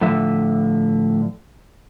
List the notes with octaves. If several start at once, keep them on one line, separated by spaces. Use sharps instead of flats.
A2 D3 F3 E5